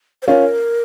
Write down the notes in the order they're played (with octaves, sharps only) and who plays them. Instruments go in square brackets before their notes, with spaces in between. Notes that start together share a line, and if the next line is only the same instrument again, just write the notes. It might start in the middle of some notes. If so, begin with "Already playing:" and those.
[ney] C5
[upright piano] C#4 F4 [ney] A#4